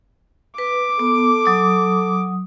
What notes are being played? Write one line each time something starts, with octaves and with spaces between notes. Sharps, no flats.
B4 D6
B3 A4
F#3 D#6